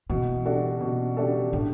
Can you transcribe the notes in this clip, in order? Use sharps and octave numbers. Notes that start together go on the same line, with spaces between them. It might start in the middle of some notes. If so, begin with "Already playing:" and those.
B2 E3
G3 D4 F#4 A4
B2
G3 D4 F#4 A4
A2 D3